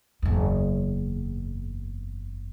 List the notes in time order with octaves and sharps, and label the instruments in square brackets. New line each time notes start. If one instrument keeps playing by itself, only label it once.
[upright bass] F#1 E2